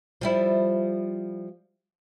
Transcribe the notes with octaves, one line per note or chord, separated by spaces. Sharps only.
F3 G3 E4